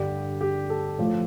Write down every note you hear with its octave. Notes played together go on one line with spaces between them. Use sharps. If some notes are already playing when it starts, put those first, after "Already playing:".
Already playing: G2 D3 G3 G4
G4
A4
A2 F3